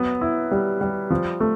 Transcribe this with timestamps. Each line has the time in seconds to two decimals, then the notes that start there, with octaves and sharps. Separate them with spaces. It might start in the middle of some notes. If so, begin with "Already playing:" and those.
Already playing: F#3 B3
0.21 E4
0.51 G3
0.81 G3
1.10 F3
1.40 A3